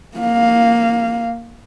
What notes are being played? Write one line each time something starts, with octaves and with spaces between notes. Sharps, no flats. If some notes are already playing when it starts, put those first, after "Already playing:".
A#3 F5